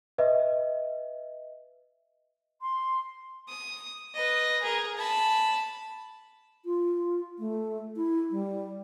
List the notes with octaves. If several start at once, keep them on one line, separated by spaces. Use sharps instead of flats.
B4 D#5 E5
C6
D#6
B4 D#5
G#4 A#4
A5 B5
F4
A3
E4
G3